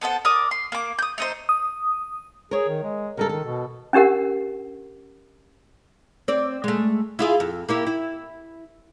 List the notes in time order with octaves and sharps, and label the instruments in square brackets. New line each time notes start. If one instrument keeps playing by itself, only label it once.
[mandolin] B3 A4 C5 F#5
A#4 D5 D6 D#6
C6
A#3 D6
D#6 G6
A3 D#4 C5
[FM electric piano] D#6
[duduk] G#4 [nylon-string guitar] A#4 C#5
[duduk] D#3
G#3
[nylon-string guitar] C#3 G3 A4 [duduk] A#4
[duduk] D#3 [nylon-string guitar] A4
[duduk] B2
[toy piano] C#4 D4 G4 A#4 F#5
[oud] C4 D5
G#3 A3
E4 F4 G#4
F2
A#3 E4 G4
E4